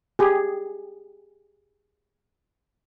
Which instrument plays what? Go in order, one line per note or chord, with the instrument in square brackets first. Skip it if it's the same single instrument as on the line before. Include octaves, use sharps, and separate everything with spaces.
[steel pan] G4 G#4